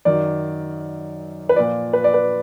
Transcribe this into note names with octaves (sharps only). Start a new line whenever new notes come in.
F#2 D#3 F#3 D5
B4
A#2 F3 D5
B4
D5
B4